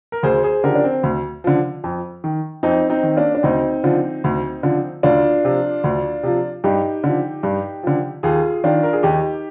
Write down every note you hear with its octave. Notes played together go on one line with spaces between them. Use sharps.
A#4
D2 G#4 C5
G#4 C5
D3 F3 G4 A#4
D4
C4
D2
D3 F3
F2
D#3
F2 C4 D#4
C4 D#4
D#3
A#3 D4
D4
D2 C4 D#4
D3 F3
D2
D3 F3
D2 D4 F4
C3 F3
D2
C3 F3
G2 D#4 G4
D3 F3
G2
D3 F3
D#2 F4 G#4
D#3 D4 F4
A#4
G#4
D#2 D#4 G4